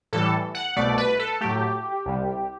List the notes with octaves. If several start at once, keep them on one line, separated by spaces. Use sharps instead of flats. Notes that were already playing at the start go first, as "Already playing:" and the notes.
A2 E3 G3 A4
F#5
C2 B2 A3 D5
B4
A4
A2 F#3 A3 G4
C2 C3 G3